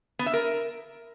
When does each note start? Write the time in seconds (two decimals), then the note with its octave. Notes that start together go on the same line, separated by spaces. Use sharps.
0.19 B3
0.26 E5
0.34 A#4